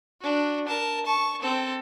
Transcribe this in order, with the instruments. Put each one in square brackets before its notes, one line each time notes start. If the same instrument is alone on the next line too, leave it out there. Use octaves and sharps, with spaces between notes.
[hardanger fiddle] D4 F#4
A#4 A5
A5 C#6
C4 A4